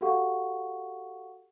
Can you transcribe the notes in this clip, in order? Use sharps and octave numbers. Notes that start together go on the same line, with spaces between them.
F#4 G4 A4 F5 F#5 C#6